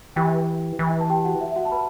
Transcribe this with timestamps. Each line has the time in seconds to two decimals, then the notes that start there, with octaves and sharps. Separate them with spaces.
0.16 E3 G4 G5
0.79 E3
1.00 A5
1.10 G4 G5
1.25 F#4 F#5
1.41 E5
1.52 E5
1.56 F#4 F#5
1.65 A5
1.71 B4 B5